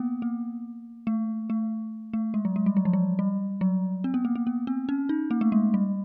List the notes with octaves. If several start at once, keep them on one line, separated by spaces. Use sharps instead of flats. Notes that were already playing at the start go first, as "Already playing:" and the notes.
Already playing: A#3 B3
A#3
A3
A3
A3
G#3
F#3
G#3
G3
F#3
F3
F#3
G3
F#3
C4
B3
A#3
A#3
B3
C4
C#4
D#4
A#3
A3
G#3
G3